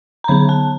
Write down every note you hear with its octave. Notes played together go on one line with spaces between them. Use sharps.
A#5
D3 F#3 B3 B5
A5